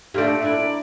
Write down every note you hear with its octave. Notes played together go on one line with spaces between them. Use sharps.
A#2 G3 A3 D4 A4 D5
D4 E4 D5
A#5